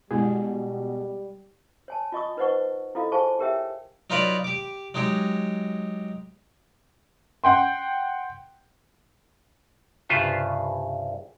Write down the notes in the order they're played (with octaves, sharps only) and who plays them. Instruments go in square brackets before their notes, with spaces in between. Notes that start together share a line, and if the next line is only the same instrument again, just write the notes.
[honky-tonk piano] B2 [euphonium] G3 [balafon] G#3 E4 [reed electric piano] G#4
[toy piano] C#5 G#5 A5
F4 D#5 C#6 D#6
D#4 B4 C5 D#5 F#5 C#6
E4 F4 A4 D#5 F5
G#4 C5 F5 G#5 A5 C#6
G4 G#4 A#4 C#5 E5 G5
[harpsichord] F#3 D#4 F4 B4 C#5 D5
G4 D6
F#3 G#3 D#4 G4
[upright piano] F#5 G5 C6
[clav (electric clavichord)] C2 G2 C#3 F4 B4 C5